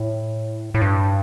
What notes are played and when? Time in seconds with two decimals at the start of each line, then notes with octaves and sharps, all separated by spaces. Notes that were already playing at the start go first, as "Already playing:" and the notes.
Already playing: A2
0.74 A2
0.82 G2